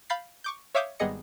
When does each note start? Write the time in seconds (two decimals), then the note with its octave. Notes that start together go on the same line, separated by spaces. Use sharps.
0.10 F5 B5 G6 A6 C7
0.44 C#6 D6 G6
0.75 C#5 E5 F5 D6 D#6 G6
1.00 G#1 G3 B3 G#4 D#5 C#7